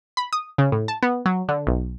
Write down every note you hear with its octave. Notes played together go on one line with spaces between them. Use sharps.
B5
D#6
C#3
A2
A5
B3
F#3
D3
B1